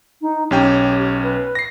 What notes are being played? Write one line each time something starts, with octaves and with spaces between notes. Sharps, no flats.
D#4
B1 C#4 G4 G5
B4
A#6 C7